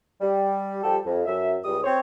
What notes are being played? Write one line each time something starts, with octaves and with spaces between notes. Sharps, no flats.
G3
F3 G3 G4 A4
F2
F#2 E5
C#2 G3 D#6
C4 C5 C#5